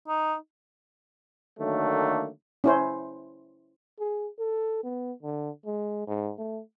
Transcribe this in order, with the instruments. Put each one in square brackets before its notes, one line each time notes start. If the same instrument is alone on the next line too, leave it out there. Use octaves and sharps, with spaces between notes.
[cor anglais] D#4
[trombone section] D3 D#3 F#3 A3 A#3
[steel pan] C#4 E4 C5
[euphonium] G#4
A4
B3
D3
G#3
G#2
A3